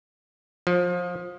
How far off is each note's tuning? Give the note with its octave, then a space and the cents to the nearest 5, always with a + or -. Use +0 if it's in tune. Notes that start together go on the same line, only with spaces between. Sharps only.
F3 +25